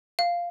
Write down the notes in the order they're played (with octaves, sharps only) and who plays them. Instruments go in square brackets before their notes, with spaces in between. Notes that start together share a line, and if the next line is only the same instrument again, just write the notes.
[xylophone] F5